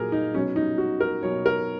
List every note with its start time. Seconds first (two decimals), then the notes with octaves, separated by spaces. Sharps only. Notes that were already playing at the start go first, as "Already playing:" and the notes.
Already playing: A#2 F#3 G#4 A#4
0.12 D#4
0.34 B2 F#3 C#4
0.56 D#4
0.78 F#4
1.00 A#4
1.23 B2 F#3 C#5
1.46 A#4